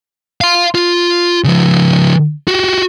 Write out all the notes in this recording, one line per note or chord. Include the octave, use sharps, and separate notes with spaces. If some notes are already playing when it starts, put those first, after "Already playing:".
F5 C6
F4
C#3 F3
F#4 G4